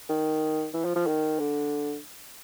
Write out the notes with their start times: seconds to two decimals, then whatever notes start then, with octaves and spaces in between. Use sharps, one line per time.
0.10 D#3
0.74 E3
0.85 F3
0.96 F3
1.07 D#3
1.39 D3